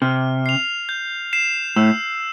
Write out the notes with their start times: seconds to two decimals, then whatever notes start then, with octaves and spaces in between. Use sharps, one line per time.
0.02 C3 F6
0.46 C7 F7
0.89 G6
1.33 C7 E7
1.76 A2 E6